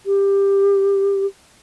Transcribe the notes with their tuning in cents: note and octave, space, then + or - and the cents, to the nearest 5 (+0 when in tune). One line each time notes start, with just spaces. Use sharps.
G4 +15